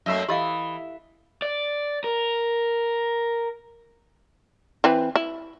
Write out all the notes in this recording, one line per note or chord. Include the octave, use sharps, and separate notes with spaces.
F#2 A3 A#3 D#5 E5 C6
E3 G4 D#5 F5 B5 D#6
D5
A#4
E3 C4 B4
E4